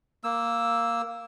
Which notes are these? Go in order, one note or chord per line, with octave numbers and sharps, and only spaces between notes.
A#3 E6